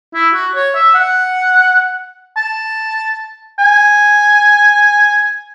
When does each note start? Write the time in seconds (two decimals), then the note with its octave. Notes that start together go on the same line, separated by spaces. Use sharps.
0.14 E4
0.34 F#4
0.55 C#5
0.75 E5
0.95 F#5
2.37 A5
3.59 G#5